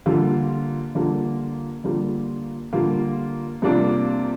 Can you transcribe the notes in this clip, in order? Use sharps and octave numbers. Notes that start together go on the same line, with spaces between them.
D3 G3 A#3 F4
D3 G3 A#3 F4
D3 G3 A#3 F4
D3 G3 A#3 F4
C3 G3 A#3 D4 F4